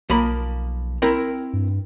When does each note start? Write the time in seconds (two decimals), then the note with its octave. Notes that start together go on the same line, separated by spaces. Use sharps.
0.10 B1 F3 A#3 B5
1.02 C4 E4 A#4
1.53 G2